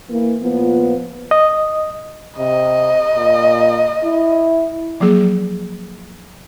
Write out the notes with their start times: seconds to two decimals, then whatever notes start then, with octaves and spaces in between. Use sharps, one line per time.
0.10 E3 A#3
0.41 A#2 F3 B3
1.31 D#5
2.38 C3 D#5
3.15 A#2
4.03 E4
5.00 F3 F#3 A#3 G#4